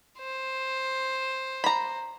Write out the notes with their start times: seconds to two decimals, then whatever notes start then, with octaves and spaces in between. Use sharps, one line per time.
0.19 C5
1.64 A#5 B5